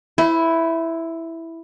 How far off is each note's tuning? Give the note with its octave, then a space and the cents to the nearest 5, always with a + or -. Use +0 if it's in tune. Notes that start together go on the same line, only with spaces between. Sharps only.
E4 +0 C5 -35